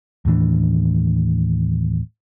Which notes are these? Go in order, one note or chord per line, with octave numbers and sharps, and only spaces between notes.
D#2 A2 E3 D4